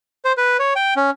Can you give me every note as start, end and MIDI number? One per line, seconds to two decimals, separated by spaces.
0.25 0.32 72
0.37 0.57 71
0.59 0.74 73
0.76 0.94 79
0.96 1.10 61